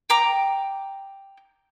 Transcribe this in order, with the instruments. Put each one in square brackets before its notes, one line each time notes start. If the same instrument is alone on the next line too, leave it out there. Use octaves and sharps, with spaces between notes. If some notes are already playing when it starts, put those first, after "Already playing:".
[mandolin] G5 A#5 D6